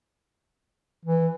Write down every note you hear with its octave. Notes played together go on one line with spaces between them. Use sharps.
E3